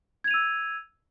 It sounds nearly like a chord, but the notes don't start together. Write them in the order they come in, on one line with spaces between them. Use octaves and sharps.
G#6 F7 D#7 E6